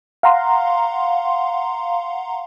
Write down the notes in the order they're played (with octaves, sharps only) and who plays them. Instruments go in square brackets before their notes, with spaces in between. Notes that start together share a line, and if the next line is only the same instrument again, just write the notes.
[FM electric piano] F5 F#5 A#5 C6